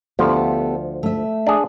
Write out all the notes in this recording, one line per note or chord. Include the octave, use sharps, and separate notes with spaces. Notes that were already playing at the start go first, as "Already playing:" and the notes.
D2 F3 B3 G4 A4
A3 E5
D4 G#4